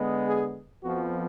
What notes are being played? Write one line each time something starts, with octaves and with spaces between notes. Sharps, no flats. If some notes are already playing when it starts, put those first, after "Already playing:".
Already playing: D3 G#3 B3
G#4
F2 F3 B3 F#4